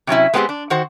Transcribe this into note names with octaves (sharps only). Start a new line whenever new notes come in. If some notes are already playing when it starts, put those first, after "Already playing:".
C3 F#3 C#4 E4
G#3 B3 C4 F4 G4 G#4
D4
D#3 F#4 C5